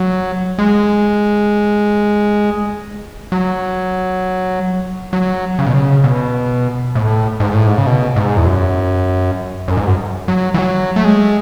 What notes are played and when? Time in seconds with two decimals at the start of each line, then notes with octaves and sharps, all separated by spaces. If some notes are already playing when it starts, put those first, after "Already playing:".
Already playing: F#3
0.59 G#3
3.32 F#3
5.13 F#3
5.59 C#3
5.66 B2
5.74 C#3
6.04 B2
6.95 A2
7.40 G#2
7.54 A2
7.67 G#2
7.78 C#3
7.86 B2
8.16 G#2
8.37 E2
8.46 F#2
9.68 F#2
9.77 G#2
9.87 F#2
10.28 F#3
10.54 E3
10.58 F#3
10.96 A3
11.05 G#3